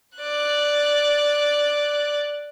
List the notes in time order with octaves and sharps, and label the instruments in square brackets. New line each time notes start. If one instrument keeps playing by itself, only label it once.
[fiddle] D5 F#6